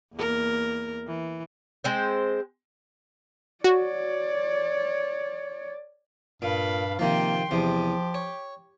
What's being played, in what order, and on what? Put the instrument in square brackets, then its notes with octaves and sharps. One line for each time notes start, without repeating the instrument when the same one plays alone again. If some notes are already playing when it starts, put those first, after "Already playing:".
[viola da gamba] E2 A#3 A#4
E3
[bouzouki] G#3 C4 C5
[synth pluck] F#4 [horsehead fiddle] C#5 D5
[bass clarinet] G2 [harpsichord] A#2 [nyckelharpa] F5 B5
[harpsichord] C3 D#3 F3 [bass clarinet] A#3 [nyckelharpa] G5 C6
[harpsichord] E2 C3 [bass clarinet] F3 [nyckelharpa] G4
[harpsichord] C#5